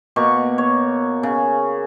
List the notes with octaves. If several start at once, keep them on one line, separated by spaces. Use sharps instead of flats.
B2 A#3 C#6
C#5
C#3